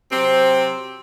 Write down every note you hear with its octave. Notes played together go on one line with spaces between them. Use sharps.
C3 F#3 C4